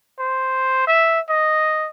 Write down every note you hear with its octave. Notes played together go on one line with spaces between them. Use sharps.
C5
E5
D#5